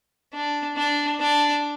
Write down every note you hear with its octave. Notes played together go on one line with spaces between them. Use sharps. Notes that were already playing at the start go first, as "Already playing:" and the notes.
D4
D4
D4